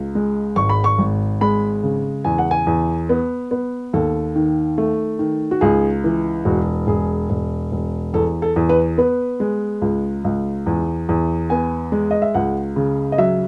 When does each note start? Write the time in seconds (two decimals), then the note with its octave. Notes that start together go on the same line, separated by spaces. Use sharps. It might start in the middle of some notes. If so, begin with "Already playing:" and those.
Already playing: C#2
0.15 G#3
0.56 G#1 C#6
0.69 B5
0.84 C#6
0.98 G#1
1.41 G#3 B5
1.83 C#3
2.24 E2 G#5
2.38 F#5
2.51 G#5
2.67 E2
3.09 B3
3.51 B3
3.93 D#2 A4
4.36 D#3
4.78 A3
5.19 D#3
5.51 F#4
5.61 C#2 G#4
6.04 E3
6.45 E1 F#4
6.87 E1 G#4
7.30 E1
7.72 E1
8.14 E2 A4
8.42 A4
8.56 E2
8.69 B4
8.98 B3 B4
9.40 G#3
9.82 C#2
10.24 C#2
10.66 E2
11.09 E2
11.50 B3 G#5
11.92 G#3
12.11 D#5
12.22 E5
12.34 C#2 F#5
12.76 C#3
13.12 D#5
13.18 F#3 E5